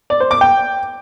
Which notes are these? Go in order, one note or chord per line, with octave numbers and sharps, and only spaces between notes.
D5
C5
D6
G5